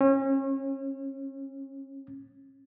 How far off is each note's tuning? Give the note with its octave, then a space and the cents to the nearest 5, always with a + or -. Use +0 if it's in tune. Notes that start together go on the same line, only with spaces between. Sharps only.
C#4 -35